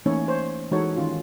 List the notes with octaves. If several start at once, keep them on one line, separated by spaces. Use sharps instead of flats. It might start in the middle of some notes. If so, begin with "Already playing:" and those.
E3 A3 A#3 C#4 D#4 C#5
C5 C#5
E3 G#3 D#4 F#4 A4 C#5
D#3 C#4 F4